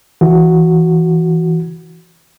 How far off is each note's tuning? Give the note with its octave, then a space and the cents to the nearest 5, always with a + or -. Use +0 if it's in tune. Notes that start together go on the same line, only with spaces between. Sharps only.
E3 +0 F#4 +0